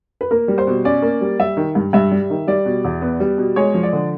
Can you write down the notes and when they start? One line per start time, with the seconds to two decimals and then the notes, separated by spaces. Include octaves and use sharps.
0.21 B4
0.31 A#3 A#4
0.48 G3
0.58 C5
0.67 B2
0.85 C#4 D5
1.02 A#3
1.21 G3
1.39 G3 E5
1.57 D#3
1.75 G2
1.93 G2 E5
2.11 G3
2.30 D#3
2.47 G3 D5
2.65 B2
2.84 E2
3.02 B3
3.20 G3
3.38 B2
3.56 G#3 C#5
3.74 F3
3.83 D5
3.93 D3